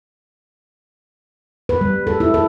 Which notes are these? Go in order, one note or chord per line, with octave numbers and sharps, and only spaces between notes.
B4
G3
A4
E4
A4